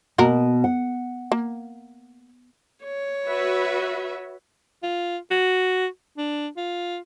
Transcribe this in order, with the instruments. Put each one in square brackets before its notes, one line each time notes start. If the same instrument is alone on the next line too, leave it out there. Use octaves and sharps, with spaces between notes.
[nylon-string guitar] B2 [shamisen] A#3 F#4 A#4
[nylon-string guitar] F#5
[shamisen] A#3
[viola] C#5
[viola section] F#4 B4 E5
[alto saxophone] F4
F#4
D4
F4